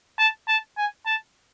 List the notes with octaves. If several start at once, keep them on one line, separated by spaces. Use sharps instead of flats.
A5
A5
G#5
A5